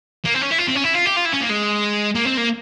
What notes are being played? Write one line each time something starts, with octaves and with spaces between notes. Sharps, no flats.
A#3
C4
C#4
E4
F4
C4
C#4
E4
F4
G4
F4
E4
C#4
A#3
G#3
A#3
C4
A#3